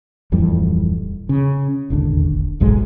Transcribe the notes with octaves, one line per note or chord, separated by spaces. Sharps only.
D1 F2 E3 G3
C#3
E1 A1 D#2 D3
F#1 B1 G#2 G#3